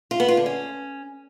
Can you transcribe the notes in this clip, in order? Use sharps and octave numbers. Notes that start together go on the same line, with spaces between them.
F4
B3
F4
D3
C#4